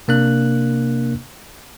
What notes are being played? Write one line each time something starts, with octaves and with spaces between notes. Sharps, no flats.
C3 A#3 D4 F#6